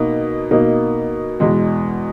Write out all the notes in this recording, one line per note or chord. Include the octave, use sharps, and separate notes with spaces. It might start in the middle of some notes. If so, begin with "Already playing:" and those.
Already playing: B2 A#3 D#4
B2 A#3 D#4
E2 B2 G#3